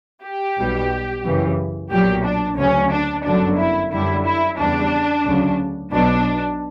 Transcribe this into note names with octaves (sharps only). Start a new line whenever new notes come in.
G4
B1 B2 G3
F#2 C#3 E3
B1 A#2 F#3 G4
D4
D2 C#3 F#3 C#4
D4
G1 F#2 D3 F#3 D4
E4
F#2 D3 G3 E4
E4
E2 C#3 G3 D4
D2 C#3 F#3
B1 B2 F#3 D4